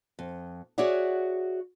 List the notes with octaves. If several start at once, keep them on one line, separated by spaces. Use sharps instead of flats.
F2
F#4 G#4 C#5 D5 E5 F#5